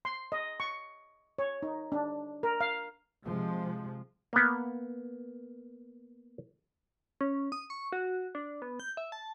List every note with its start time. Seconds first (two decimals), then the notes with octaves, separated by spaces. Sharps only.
0.05 C6
0.32 D#5
0.60 C#6
1.39 C#5
1.62 D#4
1.92 D4
2.43 A#4
2.61 F5
3.24 C3 F3 G#3
4.33 A#3 B3
7.21 C#4
7.52 D#6
7.70 C#6
7.92 F#4
8.35 D4
8.62 B3
8.80 G6
8.97 E5
9.12 A5